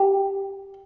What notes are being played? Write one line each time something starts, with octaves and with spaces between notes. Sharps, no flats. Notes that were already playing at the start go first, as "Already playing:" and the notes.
Already playing: G4